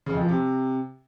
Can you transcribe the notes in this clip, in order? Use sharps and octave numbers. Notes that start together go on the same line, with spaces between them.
C#3
F2
F3
C3